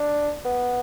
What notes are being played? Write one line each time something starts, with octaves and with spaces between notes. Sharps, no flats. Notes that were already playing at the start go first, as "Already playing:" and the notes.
Already playing: D4
B3